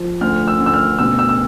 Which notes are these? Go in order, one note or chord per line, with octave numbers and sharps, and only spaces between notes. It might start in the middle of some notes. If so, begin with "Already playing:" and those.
Already playing: F3
D2 F6
E6
D2
E6
F6
B2 E6
E6
E6